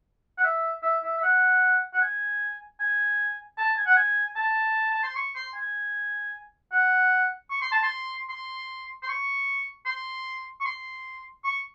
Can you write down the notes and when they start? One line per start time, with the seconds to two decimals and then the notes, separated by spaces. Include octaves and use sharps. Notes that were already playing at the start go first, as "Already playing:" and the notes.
0.38 F#5
0.43 E5
0.83 E5
1.03 E5
1.18 E5
1.23 F#5
1.94 F#5
2.01 G#5
2.80 G#5
3.58 A5
3.77 G#5
3.86 F#5
3.96 G#5
4.36 A5
4.91 A5
5.03 C6
5.16 C#6
5.35 C6
5.55 G#5
6.72 F#5
7.50 C#6
7.62 C6
7.72 A5
7.83 C6
8.29 C6
9.03 C6
9.09 C#6
9.86 C6
10.61 C#6
10.65 C6
11.44 C#6